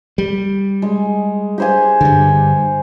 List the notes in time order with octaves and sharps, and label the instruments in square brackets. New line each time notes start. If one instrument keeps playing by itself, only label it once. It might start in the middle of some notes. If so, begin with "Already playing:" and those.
[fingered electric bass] G3
[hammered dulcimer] G#3
G4 C5 G#5
[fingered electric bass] G2 D3